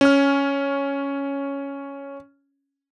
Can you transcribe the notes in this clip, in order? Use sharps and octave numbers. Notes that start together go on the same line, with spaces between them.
C#4 F6